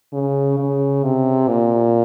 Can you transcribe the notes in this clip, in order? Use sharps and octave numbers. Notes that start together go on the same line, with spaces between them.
C#3
C#3
C3
A#2